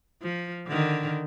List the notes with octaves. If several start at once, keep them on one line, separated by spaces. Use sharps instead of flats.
F3
D3 D#3